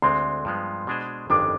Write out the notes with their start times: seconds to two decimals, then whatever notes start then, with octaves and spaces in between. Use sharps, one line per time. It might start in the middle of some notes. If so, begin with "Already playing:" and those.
0.02 D2 D3 G#3 C4 C6
0.45 G2 F3 G#3 B3
0.87 B2 G#3 D4 G#4 C5
1.30 G1 F2 D#3 G#3 D4 D6